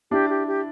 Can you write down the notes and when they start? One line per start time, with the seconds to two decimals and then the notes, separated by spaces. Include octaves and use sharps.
0.11 D4 E4 G4
0.30 G4
0.47 G4